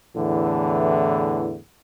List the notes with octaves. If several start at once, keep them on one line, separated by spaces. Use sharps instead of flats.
E2 A2 D3 E3